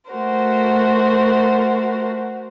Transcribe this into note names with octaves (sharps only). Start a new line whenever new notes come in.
A3 F#4 A#4 C5